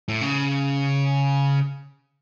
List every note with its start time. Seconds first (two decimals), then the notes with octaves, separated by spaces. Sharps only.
0.08 A2
0.21 C#3